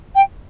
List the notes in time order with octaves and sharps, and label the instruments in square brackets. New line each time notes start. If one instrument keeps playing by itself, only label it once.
[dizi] G5